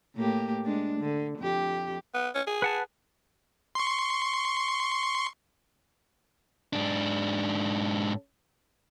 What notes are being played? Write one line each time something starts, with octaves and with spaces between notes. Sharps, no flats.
A2 A#3 G4
G#3 D4
D3
F2 G4
B3
C#4
G#4
B4 F#5 A5
C6 C#6
G#2 D4